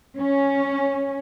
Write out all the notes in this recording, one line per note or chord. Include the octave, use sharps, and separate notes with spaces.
C#4